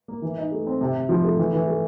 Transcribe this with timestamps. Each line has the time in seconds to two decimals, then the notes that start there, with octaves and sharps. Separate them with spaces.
0.08 A#3
0.22 E3
0.38 D#4
0.52 A3
0.67 C4
0.81 C3
0.94 C3
1.09 F3
1.24 A3
1.38 E3
1.53 E3
1.68 A3